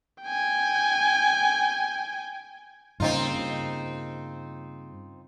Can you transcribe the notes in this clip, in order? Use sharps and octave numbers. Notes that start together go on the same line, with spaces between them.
G5 G#5
G2 C#3 A#3 C4 D#4 F4